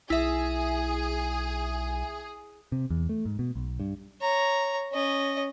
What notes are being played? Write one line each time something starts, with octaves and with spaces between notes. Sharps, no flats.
B1 E4 G#4 E5
C3
E2
A3
G#2
B2
B1
G2
C#5 A#5
C#4 D#5